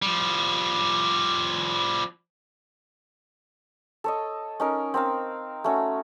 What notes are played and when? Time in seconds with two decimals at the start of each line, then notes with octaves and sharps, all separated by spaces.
0.02 F3 G3
4.04 A4 C#5 D#5
4.60 C#4 D#4 A#4
4.94 C4 A#4 F5
5.64 A3 C#4 F#4